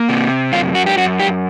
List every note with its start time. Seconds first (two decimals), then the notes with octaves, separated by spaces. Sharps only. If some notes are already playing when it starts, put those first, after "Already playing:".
Already playing: A#3
0.09 C3
0.52 F#2 F4
0.75 F#4
0.86 G4
0.97 F#2 F#4
1.20 G4